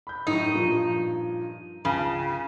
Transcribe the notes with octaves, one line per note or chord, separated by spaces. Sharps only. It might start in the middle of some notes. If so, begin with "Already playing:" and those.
B5 G6
F#2 A2 D#4
G2 A#2 F3
C#2 C#3 A5